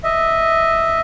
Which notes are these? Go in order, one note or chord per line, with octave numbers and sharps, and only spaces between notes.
D#5 E5